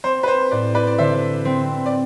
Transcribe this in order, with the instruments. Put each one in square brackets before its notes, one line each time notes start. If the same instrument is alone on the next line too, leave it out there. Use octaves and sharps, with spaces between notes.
[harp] C4 [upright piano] C5
[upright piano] B4
C5
[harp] A2 [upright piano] B4 D5
[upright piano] B4 D5
D5
[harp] D3 [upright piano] C5 E5
[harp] C4
[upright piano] D5